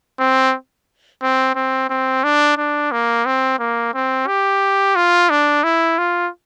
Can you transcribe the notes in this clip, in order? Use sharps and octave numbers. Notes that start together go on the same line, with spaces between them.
C4
C4
C4
C4
D4
D4
A#3
C4
A#3
C4
G4
F4
D4
E4
F4